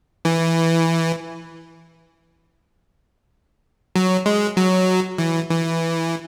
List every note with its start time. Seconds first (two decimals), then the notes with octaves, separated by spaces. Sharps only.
0.25 E3
3.96 F#3
4.26 G#3
4.57 F#3
5.18 E3
5.50 E3